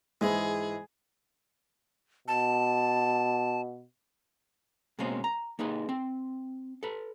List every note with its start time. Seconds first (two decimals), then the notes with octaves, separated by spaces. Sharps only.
0.21 G#2 E3 G#3 G#4
2.28 B2 A5
4.99 B2 G#3 A#3 C4 C#4
5.24 A#5
5.59 A#3 D#4 G#4 B4
5.89 C4
6.83 A4 B4